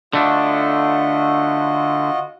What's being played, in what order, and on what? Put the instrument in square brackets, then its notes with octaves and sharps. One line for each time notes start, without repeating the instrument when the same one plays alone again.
[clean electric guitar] D3 A3 D4 [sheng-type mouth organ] F4 F#4 D#5